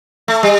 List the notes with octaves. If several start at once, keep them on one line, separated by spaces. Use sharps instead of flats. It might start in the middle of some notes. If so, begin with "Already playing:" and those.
A3
G3